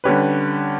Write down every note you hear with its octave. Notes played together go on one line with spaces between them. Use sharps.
D3 G3 C#4 G4 B4